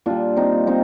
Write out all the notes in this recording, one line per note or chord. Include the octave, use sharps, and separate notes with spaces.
A#2 G3 D4 F4
C4 D#4
C4 D#4